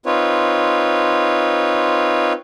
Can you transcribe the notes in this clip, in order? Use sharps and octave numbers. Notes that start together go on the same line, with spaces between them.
C4 D#4 F4 B4 C#5